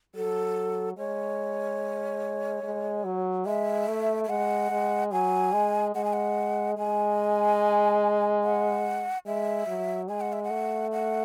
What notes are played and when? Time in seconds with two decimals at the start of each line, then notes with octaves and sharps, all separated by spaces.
0.15 F#3 A4
0.97 G#3 C#5
2.63 G#3
3.04 F#3
3.45 G#3 E5
3.88 A3
4.24 E5
4.29 G#3 F#5
4.71 G#3
5.12 F#3 G#5
5.53 G#3
5.95 G#3 F#5
6.04 G#5
6.13 F#5
6.77 G#3 G#5
8.44 F#5
9.26 G#3 E5
9.67 F#3
10.09 G#3 G#5
10.20 F#5
10.33 E5
10.43 F#5
10.50 A3
10.92 F#5